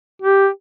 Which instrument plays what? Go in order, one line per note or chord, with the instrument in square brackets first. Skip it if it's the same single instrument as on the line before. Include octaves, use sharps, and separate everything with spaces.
[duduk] G4